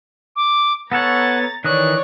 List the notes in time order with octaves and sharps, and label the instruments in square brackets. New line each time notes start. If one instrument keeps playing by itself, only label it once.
[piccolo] D6
[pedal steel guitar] B3 A4 C#5 [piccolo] F#5 [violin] A#5 A6
[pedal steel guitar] D#3 E3 D#6 [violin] C#5 D5 [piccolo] F#6